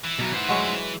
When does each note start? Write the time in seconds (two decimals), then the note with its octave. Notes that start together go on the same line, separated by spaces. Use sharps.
0.04 E3
0.19 B2 F#3
0.33 C5 F#5
0.49 F#3 G#3 C#5